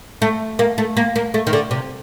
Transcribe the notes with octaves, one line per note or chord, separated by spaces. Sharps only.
A3
A#3
A3
A#3
A#3
A3
D#3
D3
C3